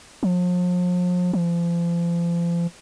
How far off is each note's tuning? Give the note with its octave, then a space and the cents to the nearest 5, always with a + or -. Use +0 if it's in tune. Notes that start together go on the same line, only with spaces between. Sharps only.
F3 +40
F3 -35